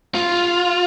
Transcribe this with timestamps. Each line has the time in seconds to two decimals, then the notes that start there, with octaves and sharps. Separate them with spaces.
0.15 F4